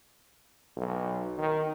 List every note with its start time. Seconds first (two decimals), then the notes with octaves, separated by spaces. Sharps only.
0.76 B1
1.38 D#3